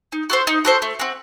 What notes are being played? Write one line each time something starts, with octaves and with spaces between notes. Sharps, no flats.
D#4
F#4 A4 C5
D#4
F#4 A4 C5
A3
C4 F#4